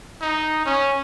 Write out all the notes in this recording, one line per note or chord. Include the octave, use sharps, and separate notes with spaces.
D#4
C#4